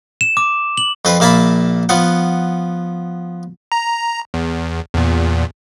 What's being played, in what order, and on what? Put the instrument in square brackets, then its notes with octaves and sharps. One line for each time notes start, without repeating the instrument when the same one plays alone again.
[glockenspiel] E7
D6
F#7
[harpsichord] F2 C4 B4
A#1 A#3 E5 A5 B5
F3 B3 F#5
[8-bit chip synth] A#5
E2
E2 A#2